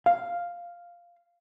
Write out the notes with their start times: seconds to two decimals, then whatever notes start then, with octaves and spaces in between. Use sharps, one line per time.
0.06 F5